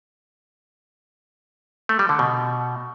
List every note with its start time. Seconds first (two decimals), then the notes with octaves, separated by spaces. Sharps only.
1.89 A3
1.99 G3
2.09 D3
2.19 B2